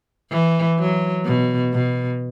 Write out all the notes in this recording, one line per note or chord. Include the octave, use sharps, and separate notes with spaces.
E3
F#3
B2
B2